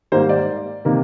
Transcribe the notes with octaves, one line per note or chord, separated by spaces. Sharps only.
G#2 D#3 G3 A#3 C5
D5
C3 D#3 A#3